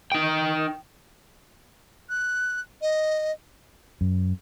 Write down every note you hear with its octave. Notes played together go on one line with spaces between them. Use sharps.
D#4 G5
F#6
D#5
F#2